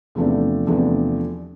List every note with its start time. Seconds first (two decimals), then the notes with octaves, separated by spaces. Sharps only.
0.15 E2 C3 F3 A3 D4
0.67 E2 C3 F3 A3 D4